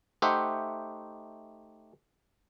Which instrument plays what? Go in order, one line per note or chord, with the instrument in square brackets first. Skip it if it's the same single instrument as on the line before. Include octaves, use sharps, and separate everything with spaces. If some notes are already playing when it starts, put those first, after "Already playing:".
[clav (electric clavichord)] A3 D#4 G4 C5 E5 F#5